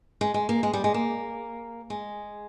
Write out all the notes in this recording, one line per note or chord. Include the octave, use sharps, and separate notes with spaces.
G#3
G#3
A#3
G#3
G3
G#3
A#3
G#3